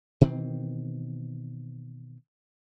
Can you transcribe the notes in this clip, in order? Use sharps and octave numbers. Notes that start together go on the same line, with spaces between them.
B2 D#3 E3 C4